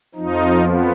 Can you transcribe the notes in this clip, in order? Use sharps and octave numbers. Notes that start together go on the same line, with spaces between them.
F2 F3 D#4
B3